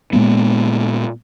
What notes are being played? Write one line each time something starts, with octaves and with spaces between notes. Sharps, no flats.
A#2 G#3 A#3 B3